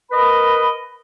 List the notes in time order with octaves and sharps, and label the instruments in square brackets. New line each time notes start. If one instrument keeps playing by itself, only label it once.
[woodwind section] A#4 B4 D#5 B5